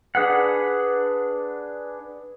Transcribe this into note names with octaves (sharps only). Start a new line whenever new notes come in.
D4 G#4 B4 F#5